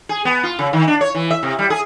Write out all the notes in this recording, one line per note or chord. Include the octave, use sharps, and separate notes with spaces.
G#4
B3
F4
C#3
D#3
D4
C#5
E3
E5
C3
G3
G#4